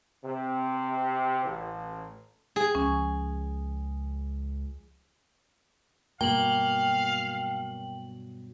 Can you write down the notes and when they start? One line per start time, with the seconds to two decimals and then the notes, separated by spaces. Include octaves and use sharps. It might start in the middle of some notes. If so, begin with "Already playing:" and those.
0.24 C3
1.44 A1
2.56 G#4
2.75 C#2 F3 C#4
6.21 G2 B2 F#3 A#3 F5 G5 F#7